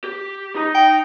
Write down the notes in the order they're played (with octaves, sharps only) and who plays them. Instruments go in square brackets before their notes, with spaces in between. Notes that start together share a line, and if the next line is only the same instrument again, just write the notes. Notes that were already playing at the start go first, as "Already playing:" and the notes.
[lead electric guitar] G4
D#4 A#5
[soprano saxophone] G5